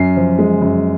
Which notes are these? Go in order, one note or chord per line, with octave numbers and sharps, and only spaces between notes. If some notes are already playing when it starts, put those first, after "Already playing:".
Already playing: F#2 C7
F3
G#3
F#2